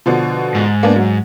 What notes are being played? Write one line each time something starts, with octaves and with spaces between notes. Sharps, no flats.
B2 D3 F3
G#2
A#3 B3 D4
F#3